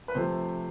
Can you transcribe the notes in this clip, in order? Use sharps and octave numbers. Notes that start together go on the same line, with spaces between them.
B4
C3 F3 A3 C5